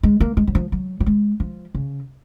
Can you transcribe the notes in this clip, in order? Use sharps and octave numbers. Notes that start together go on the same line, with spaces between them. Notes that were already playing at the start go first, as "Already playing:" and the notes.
G#3
A#3
G#3
F#3
F3
F#3
F#3
G#3
F3
C#3